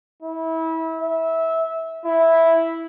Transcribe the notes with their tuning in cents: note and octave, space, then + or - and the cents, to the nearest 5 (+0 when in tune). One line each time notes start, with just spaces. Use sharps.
E4 -25
E5 -20
E4 -5